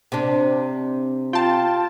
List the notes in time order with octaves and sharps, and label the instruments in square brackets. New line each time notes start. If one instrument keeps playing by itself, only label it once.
[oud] C3 D4
[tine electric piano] F4 [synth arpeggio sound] G5 A5